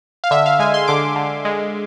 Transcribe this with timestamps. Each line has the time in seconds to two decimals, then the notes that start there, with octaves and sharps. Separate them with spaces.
0.24 F5
0.31 D3 E5
0.46 F5
0.59 G#3 G#5
0.74 C6
0.88 D3 D6
1.16 D3
1.45 G#3